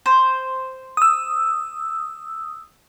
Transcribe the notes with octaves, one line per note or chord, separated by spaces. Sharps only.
C5
D#6 E6